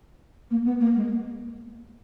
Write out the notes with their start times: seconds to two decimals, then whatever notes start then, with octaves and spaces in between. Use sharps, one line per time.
0.50 A#3
0.65 B3
0.80 A#3
0.96 G#3